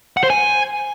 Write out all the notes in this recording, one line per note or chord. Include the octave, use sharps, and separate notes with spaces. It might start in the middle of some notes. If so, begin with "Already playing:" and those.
F#5
C5
G#5